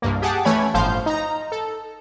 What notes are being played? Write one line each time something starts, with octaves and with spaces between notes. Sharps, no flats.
C2 G2 A#3
G4 G#4 F#5 A5 D6
E3 A3 C#4 C#5 B5 G#6
G1 A2 F3 C5 F5 G6
D#4 A#5
A4